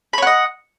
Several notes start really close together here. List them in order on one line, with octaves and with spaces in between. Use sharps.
B5 C#5 F#5 D#5